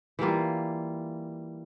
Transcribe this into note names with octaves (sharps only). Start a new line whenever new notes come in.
E3 G3 A#3 F4